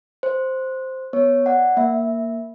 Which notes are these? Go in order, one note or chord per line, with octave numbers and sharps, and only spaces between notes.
C5
B3 C#5
D5 F#5
A#3 E5